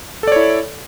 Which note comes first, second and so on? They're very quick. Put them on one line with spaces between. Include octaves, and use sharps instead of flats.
A4 D5 C#5 E4